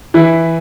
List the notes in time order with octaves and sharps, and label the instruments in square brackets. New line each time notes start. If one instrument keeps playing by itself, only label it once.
[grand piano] E3 E4